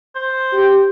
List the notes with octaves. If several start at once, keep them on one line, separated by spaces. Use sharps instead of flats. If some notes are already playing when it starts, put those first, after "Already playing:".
C5
G4